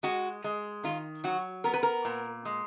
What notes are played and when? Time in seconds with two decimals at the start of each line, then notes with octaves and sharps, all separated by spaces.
0.03 G#3 F#4
0.44 G#3
0.84 D#3 F4
1.24 F#3 F#4
1.64 B3 A#4
1.74 B4
1.83 A#4
2.05 A#2
2.45 G#3